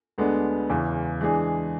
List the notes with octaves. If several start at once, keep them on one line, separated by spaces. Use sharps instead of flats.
D2 D3 G#3 B3 D4
E2 C#3 E3
E3 G#3 D4 G#4